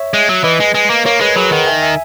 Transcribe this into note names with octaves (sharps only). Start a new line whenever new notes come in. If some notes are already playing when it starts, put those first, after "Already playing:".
Already playing: C#5 E5
G#3
F#3
E3 B4 D#5
G#3
G#3
A#3
A#3 A#4 C#5
G#3 G#4 B4
F#3 G#4 B4
D#3 D#5 F#5
E5 G#5
E5 G#5